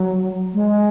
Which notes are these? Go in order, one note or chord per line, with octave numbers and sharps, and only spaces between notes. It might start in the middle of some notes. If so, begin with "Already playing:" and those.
Already playing: F#3
G#3